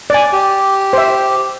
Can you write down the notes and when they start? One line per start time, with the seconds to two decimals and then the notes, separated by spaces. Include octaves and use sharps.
0.10 D5 G#5
0.33 G4
0.93 C5 E5